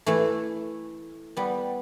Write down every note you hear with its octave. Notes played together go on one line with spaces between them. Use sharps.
E3 A3
G3 B3